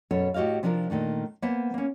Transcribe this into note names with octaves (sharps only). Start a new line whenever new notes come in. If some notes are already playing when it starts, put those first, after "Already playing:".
F#2 B2 C#4 A4 C#5
A2 F#4 G4 D#5 F5
C3 F3 D4 F4 A#4
A#2 D#3 A3 D4
A#3 B3 C5 E5 G#5
A#3 C#4